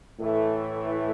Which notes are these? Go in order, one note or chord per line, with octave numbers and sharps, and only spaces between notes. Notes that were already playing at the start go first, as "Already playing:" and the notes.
A2 E3 A3